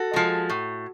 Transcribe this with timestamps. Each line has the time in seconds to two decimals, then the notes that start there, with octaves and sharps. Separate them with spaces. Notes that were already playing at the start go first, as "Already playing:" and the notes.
Already playing: F#4 A4
0.14 F3 G#3
0.50 A2